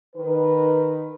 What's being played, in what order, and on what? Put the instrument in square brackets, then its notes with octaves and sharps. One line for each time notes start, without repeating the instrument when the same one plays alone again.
[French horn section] D#3 B4